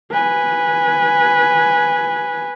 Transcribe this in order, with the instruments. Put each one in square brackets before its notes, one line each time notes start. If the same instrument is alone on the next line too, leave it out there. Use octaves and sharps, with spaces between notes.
[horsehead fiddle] B4 G#5